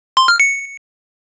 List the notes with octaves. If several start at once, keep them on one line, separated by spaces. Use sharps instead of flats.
C6
F6
C#7